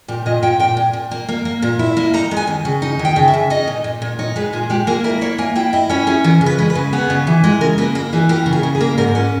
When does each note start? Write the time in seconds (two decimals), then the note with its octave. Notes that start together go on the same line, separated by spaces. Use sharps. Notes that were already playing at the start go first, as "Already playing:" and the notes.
0.08 A#2 G4
0.26 A#2 D#5
0.43 A#2 G5
0.60 A#2 G5
0.77 A#2
0.93 A#2
1.11 A#3
1.28 A#3
1.45 A#3
1.62 A#2
1.79 E4
1.97 A#3
2.14 D#4 A#5
2.31 G#3
2.37 G#5
2.47 D#2
2.65 C#3
2.82 D#4
2.99 D#2
3.05 G5
3.16 C#3
3.28 E5
3.34 C#3
3.50 D#4 D#5
3.67 A#2
3.84 A#2
4.02 A#2
4.19 D#4 C#5
4.36 G#3 B4
4.53 A#2 G#4
4.70 G#3 G4
4.87 A#3 G#4
5.04 E4 A#4
5.21 A#3 C#5
5.38 A#3 G#5
5.56 E4 G5
5.73 E4 D#5
5.89 C#4 C#5
6.07 C#4 G#4
6.24 E3 A#4
6.41 C#3
6.46 B4
6.58 G#3
6.70 B4
6.75 C#3
6.93 B3 G#4
7.10 C#3
7.27 E3
7.44 G#3
7.61 C#3 A#4
7.78 A#3 B4
7.95 A#3 A#4
8.13 E3 G#4
8.29 A#3 G4
8.46 C#3
8.53 G#4
8.63 C#3
8.75 G#4
8.81 A#3
8.98 G#2 A#4
9.15 C#4 B4